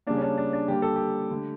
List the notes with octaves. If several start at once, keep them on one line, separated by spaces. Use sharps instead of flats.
C#3 G3 A#3 D4
C#4
D4
D4
D4
D3 G3 A#3 G4
A4
G4
D3 A3